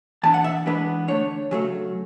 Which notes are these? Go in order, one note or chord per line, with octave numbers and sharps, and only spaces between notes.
E3 B3 D4 A5
F#5
E5
E3 G#3 B3 D4 B4
D3 A3 D4 C#5
C#3 F#3 A3